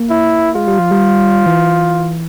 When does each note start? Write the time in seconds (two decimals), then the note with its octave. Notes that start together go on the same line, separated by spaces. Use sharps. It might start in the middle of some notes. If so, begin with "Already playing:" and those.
Already playing: A#3
0.10 E4
0.55 G#3 F4
0.68 G3
0.79 F3
0.91 G3
1.46 E3